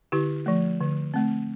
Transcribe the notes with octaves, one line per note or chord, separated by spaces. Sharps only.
D3 E4 G4
F3 A3
D3
A3 C4